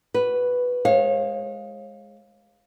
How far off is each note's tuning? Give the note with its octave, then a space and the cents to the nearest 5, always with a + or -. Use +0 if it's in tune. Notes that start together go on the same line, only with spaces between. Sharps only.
F#4 +20 B4 +0
G#3 +0 C#5 -35 F5 +0